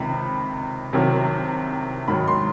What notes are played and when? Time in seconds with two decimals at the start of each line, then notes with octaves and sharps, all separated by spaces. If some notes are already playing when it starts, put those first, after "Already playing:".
Already playing: C#2 C3 D#3 B5
0.93 C2 C3 D#3 F#3
2.08 G#2 D#3 F#3 B5
2.28 C6